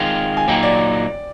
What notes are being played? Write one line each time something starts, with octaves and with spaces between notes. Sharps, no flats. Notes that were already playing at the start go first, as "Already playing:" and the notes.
Already playing: D#3 G#3 C4 F4
G#5
A#2 F#3 A#3 D#4 G5
D5